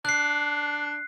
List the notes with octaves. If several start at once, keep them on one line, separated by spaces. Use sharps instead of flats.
D4 F#6 C7